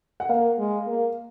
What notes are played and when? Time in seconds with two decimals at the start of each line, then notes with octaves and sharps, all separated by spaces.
0.20 F#5
0.29 A#3 F5
0.58 G#3
0.87 A#3